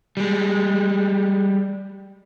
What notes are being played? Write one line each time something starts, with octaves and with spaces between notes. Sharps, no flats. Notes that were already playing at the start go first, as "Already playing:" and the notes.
G3 G#3